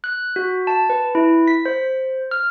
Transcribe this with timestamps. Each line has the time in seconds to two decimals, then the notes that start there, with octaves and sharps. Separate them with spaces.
0.04 F#6
0.36 F#4
0.67 A5
0.90 B4
1.15 E4
1.48 B6
1.65 C5
2.31 F6